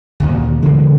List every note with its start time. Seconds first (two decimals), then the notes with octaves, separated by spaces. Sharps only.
0.20 D2 A#2 D#3
0.62 C#3 E3 G#3 C4